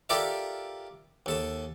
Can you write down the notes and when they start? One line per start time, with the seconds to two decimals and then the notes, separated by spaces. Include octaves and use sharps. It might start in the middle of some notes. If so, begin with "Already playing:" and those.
0.09 F4 G4 A4 A#4 D5 E5
1.26 D#2 A4 A5